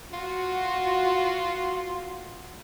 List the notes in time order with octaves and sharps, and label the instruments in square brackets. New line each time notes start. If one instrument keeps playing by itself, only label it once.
[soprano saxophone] F4 [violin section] F#4